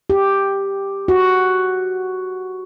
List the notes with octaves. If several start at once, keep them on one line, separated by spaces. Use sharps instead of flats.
G4
F#4